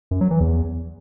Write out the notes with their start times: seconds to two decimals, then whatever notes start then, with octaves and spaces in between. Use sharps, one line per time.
0.11 F#2
0.21 F#3
0.31 E3
0.40 E2